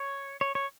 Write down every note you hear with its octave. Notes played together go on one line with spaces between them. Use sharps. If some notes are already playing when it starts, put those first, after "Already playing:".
Already playing: C#5
C#5
C#5